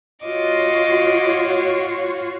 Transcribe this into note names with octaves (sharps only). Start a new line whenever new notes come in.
F4 F#4 C#5 D#5 D6